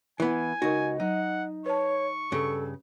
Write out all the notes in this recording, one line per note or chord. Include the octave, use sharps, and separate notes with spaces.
E3 B3 E4 G#5
C#2 D#4 F#4 A#4 D#5
F#3 D#4 F#5
B4 C#5 A5 C#6
G2 C#3 A4